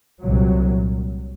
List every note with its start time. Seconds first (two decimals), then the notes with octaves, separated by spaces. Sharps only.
0.21 C2 A#2 F#3